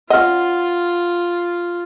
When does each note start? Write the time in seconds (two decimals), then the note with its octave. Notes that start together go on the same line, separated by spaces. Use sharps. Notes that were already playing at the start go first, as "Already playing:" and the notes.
0.10 C#4 F4 D#5 F#5 F6